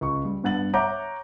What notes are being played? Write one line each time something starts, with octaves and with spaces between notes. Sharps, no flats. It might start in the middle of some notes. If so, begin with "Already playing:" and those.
C#2 C#6
G3
G2 B3 F#5 A6 F#7
C#5 E5 F#5 A#5 D6 G6